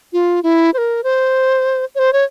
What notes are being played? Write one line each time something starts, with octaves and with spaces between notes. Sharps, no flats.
F4
E4
C5
A#4
C5
C#5
C5
C#5